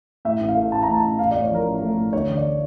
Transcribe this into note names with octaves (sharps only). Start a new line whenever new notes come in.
A2 E5
A1
F5
A3
A1 A5
A#5
A2
A5
A1
A1 F5
A2 D5
C#5
F3 A#4
A1
A3
A2
D2 C#5
D3
D5